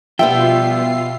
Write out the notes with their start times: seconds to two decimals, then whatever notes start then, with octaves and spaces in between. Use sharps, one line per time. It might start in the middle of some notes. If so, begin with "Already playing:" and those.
0.19 B2 F3 G3 B3 F4 E5 G5 C7